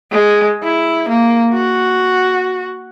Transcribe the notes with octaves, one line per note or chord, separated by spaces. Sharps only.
G#3
E4
A#3
F#4